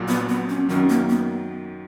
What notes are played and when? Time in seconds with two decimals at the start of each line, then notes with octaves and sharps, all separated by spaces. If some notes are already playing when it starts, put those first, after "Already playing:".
Already playing: A#1 A#2 F#3
0.08 B3
0.29 B3
0.49 C#4
0.69 F#2 D#3 F#3 C#4
0.90 A#3
1.09 B3